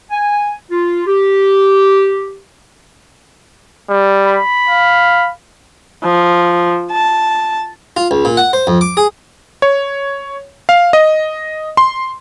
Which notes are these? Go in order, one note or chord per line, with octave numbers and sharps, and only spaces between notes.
G#5
F4
G4
G3
B5
F5
F3
A5
F4
C#2
A#2
F#5
C5
F2
D6
G#4
C#5
F5
D#5
C6